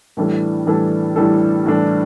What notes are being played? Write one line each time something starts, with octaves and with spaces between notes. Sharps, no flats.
A2 E3 G3 D4 A4
A2 E3 G3 D4 A4
A2 E3 G3 D4 A4
A2 E3 G3 D4 A4